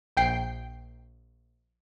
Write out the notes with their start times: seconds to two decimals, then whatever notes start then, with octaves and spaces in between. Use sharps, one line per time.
0.17 A#1 G5 C7